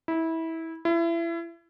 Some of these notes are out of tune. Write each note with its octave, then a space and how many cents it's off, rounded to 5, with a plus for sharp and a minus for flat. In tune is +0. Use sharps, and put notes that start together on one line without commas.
E4 -20
E4 +30